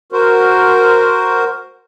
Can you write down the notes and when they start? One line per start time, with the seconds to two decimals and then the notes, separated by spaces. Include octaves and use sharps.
0.12 F#4 A#4 C5